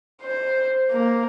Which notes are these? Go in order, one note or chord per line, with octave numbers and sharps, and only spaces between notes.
C5
A#3